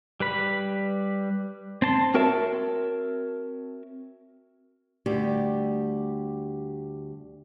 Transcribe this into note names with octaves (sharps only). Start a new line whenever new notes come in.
G3 B4 B5
C4 A5 C6
C4 F#4 A#4 C#5 E5 A5
D2 G3 G4 G5